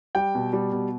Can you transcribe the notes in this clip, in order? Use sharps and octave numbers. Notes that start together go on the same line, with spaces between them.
G3 G5
B2
G3
B2